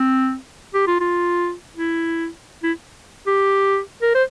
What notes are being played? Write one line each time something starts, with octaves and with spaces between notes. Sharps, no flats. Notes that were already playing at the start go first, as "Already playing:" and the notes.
Already playing: C4
G4
F4
F4
E4
E4
G4
A#4
C5